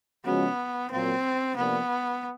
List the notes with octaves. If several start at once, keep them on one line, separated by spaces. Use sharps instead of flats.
C#3 F3 G#3 B3 C#4 F#4
A#2 F#3 A#3 C4
C3 F3 A#3 B3 D4